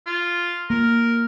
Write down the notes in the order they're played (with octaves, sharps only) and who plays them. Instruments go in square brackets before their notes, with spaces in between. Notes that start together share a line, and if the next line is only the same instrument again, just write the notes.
[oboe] F4
[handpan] A#3 [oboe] A#4